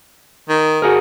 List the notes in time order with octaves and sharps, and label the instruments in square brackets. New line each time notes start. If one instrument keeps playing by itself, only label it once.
[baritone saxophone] D#3
[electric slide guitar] F#4 G#4 A#4